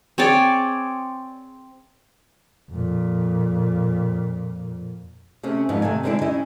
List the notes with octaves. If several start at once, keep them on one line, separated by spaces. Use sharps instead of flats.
C4 G#4 C#5 D5
F2 A#2
C3 A3 C#4 G#4
F2 G#2 G3 B3 D#4
C3 D#3 A3 G#5
D3 E3 G#3 C4 D4 E4
G3 C#4 D#4 E4 D#5